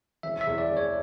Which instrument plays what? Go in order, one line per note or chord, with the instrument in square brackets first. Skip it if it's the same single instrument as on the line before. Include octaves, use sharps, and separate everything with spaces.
[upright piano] E1 [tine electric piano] E5
[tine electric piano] E5
[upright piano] E2
[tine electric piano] D5
[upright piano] E1
[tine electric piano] C#5